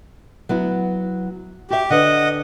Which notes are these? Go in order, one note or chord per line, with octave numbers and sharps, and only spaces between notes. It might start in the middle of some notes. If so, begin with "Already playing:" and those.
F#3 B3 E4
F#4 G4 E5
D3 B4 D#5 F#5